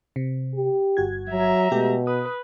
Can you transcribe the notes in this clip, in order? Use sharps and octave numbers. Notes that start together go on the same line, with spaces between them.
C3
G4
G1 F#4 G#6
F#3 E5 A#5
B2 G#3 A3 G4
B4 D#6